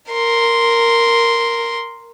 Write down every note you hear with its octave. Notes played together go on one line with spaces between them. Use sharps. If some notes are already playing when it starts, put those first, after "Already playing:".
A#4 C6